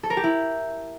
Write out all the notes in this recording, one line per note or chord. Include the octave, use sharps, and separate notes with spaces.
A4
A#4
G4
E4